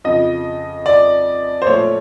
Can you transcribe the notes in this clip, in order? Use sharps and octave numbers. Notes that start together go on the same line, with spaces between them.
F2 C#3 F3 D#5
D5
C5
A#2 F3 A3 C#5